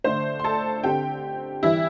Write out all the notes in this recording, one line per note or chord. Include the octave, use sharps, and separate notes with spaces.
D3 A3 D4 C5 C6
C6
A4 A5
D3 C4 G4 G5
E3 G3 E4 E5